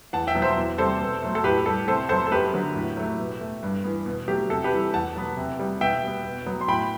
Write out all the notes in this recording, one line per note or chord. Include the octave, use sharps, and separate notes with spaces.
E2 F#5 A5
E5 G5
B2 F#3
C5 E5
E2
C3 G3 A4 C5
B2
F#3 A3
A4
A2 G4 B4
G3 B3 A4
C3 A4 C5
F#3 B3 A4 C5
A4
F#2 G4 B4
D3 F#3 B3
A2
F#3 A3
B2
A3
G2
E3 B3
B2
F#3 A3 G4
C3 A4
G4 B4
E3 G3
E2 F#5 A5
B2 F#3 B3
C3
G3 B3
B2 E5 G5
G3 B3
B2
F#3 B3
C6
A2 G5 B5